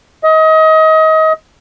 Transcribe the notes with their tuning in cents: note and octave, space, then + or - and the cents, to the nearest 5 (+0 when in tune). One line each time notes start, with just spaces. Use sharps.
D#5 +30